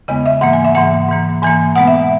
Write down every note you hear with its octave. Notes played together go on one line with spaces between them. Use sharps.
E2 C#3 G#3 B3 D#5
E5
G#2 E3 A#3 F#5
G#5
E5
G#2 E3 A#3 F#5
G#2 E3 A#3
G#2 E3 A#3 G#5
B2 G#3 B3 F#5
E5